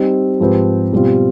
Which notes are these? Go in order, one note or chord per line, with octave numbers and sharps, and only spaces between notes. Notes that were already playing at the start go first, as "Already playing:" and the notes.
Already playing: G3 C4 D#4
G#2 F3 C4 G4 B4
B2 G3 C4 F4